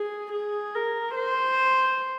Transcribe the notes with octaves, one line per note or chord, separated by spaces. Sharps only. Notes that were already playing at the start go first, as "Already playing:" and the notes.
Already playing: G#4
G#4
A#4
C5